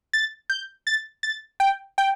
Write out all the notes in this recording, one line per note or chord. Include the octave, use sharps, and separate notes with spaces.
A6
G6
A6
A6
G5
G5